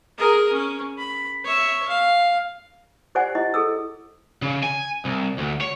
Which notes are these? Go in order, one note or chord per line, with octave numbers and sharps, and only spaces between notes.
G#4 A#4
C#4
B5
C#5 E5
F5
G4 C5 D5 F#5 G#5
E4 G4 D#5
G#4 A4 E6
C#3
G#5
C2
D2
C#5